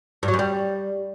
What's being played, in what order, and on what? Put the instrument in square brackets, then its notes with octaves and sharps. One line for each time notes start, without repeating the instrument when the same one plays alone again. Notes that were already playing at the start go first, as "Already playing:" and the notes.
[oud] G2
F#3
F#2
G3